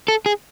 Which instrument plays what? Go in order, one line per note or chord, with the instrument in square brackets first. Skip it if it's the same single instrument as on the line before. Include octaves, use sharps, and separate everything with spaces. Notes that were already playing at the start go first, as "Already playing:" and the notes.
[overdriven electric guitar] A4
G#4